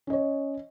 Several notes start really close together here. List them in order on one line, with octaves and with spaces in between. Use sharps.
C#4 D#5 C#5